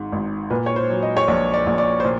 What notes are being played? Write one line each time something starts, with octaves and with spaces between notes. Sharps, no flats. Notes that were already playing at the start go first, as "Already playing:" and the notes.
Already playing: G#1 G#2
G#1
A#2 B4
C#5
C5
F#3
D#5
C#5
A#1 D5
D5
A#1
D5
C5
A#2